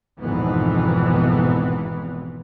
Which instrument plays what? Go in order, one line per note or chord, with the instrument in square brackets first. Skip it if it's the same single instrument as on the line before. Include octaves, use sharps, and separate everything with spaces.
[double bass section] G#1 F2 G#2 B2 E3 B3